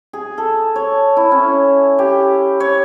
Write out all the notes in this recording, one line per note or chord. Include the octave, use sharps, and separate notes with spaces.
G#4
A4
C#5
E4
C#4
G4
C#5